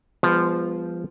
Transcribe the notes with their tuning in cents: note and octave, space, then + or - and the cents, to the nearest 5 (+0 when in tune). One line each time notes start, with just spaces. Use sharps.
F3 -10 G#3 -40 B3 +10